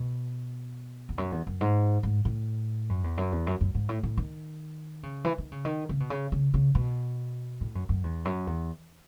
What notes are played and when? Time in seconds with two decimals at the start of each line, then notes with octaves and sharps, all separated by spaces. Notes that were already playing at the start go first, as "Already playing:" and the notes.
Already playing: B2
1.09 E2
1.18 F#2
1.32 E2
1.47 F#2
1.61 G#2
2.03 G#2
2.25 A2
2.89 F#2
3.04 E2
3.17 F#2
3.32 E2
3.47 F#2
3.61 F#2
3.75 G#2
3.89 A2
4.03 A2
4.17 D#3
5.03 C#3
5.24 E3
5.38 D#3
5.52 C#3
5.65 D#3
5.89 C#3
6.00 B2
6.10 C#3
6.32 C#3
6.54 C#3
6.75 B2
7.61 A2
7.75 F#2
7.89 F#2
8.04 E2
8.25 F#2
8.47 E2